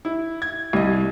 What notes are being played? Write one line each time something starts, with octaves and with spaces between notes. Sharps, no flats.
E4
G#6
C2 D#5